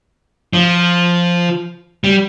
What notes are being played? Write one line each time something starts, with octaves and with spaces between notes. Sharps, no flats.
F3
G3